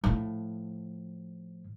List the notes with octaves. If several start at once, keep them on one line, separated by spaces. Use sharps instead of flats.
A2 F3